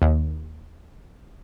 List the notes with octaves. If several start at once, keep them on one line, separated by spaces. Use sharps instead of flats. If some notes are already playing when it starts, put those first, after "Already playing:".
D#2